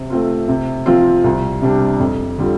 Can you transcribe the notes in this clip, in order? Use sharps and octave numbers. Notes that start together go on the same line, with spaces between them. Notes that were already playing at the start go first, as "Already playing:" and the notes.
Already playing: C3
A3 C4 F4
C3
F3 C4 F4
C2
C3 G3 D4
F2
D3 G3 F4